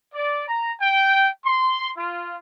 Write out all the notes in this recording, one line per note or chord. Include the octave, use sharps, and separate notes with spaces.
D5
A#5
G5
C6
F4